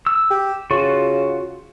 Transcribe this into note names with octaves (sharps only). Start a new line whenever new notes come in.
E6
G4
C#3 F4 F#4